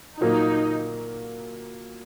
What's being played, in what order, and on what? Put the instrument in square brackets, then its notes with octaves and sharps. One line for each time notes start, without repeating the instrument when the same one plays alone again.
[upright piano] A#2 F#3 A#3 [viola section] D#4